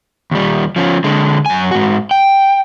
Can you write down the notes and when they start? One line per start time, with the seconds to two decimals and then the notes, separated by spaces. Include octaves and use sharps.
0.31 D#2 G3
0.76 F3 C#4
1.04 D3 G#3
1.46 F#2 G#5
1.71 G#2 F#4
2.11 G5